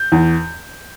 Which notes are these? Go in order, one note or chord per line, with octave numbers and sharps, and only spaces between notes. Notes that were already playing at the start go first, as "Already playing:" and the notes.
Already playing: G6
E2